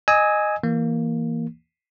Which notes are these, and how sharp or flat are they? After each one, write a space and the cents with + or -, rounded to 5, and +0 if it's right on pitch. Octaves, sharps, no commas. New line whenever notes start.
D#5 -15 G#5 +0 E6 -40
E3 +0 A#3 -5